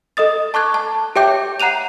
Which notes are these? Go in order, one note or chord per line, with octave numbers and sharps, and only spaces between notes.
A4 D#5 D#6 A6
A5 C#6 D6 F#6 G#6
A5
G4 C#5 E5 G5 D6 G6
F#5 A#5 F#6 D#7 F7